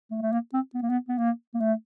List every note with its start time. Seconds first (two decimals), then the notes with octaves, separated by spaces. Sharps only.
0.11 A3
0.22 A3
0.32 A#3
0.54 C4
0.74 B3
0.83 A#3
0.89 B3
1.09 B3
1.18 A#3
1.54 A#3
1.61 A3